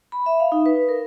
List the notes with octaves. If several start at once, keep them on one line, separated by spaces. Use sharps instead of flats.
B5
E5
F5
D#4
B4
A#4